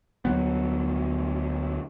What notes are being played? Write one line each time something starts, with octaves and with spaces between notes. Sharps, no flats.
D2 F#3 B3